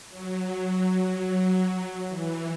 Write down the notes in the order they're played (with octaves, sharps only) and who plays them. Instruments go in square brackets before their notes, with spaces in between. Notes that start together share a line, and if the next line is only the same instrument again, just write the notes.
[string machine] F#3
E3